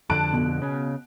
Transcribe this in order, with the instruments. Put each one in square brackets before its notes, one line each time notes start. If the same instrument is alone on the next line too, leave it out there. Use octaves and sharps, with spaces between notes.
[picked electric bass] F2 D3 [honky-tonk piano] A5 F#6 D7
[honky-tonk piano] B2
[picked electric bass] C#3